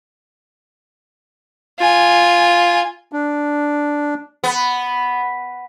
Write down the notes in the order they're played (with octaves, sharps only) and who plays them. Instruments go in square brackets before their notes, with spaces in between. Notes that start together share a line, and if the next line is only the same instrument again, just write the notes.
[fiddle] F4 G#5
[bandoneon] D4
[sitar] B3